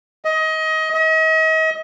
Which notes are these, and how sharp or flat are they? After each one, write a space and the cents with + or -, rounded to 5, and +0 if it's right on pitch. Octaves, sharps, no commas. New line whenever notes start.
D#5 +25
D#5 +40